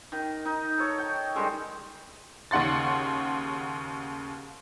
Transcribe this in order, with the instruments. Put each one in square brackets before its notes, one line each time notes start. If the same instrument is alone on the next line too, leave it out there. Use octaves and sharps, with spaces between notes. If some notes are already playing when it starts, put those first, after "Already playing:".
[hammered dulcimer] D#3
D#4
A4 C#5
G5
D#3 G3 G#3 A4
[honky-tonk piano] D#2 C#3 F#5 C6 A6